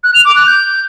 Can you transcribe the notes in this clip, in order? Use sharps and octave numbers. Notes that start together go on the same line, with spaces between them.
F#6
F7
D6
F#6
G6